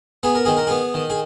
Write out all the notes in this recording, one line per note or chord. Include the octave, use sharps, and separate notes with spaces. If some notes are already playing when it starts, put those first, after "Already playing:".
B3 G#4
A#4
D#3 G#4
A#4
B3 G#4
D#3
G#4